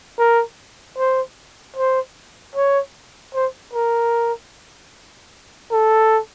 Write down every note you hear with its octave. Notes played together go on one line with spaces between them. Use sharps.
A#4
C5
C5
C#5
C5
A#4
A4